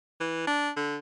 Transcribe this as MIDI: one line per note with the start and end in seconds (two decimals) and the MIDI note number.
0.20 0.47 52
0.47 0.70 62
0.76 0.97 50